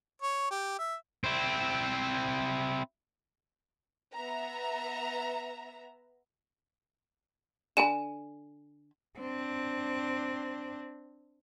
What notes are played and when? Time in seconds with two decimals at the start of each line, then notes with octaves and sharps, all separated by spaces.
0.22 C#5
0.51 G4
0.79 E5
1.24 C4 E4
4.14 B3 E5 A#5
7.77 D3 G#5 B5 D#7 E7
9.19 C4 D4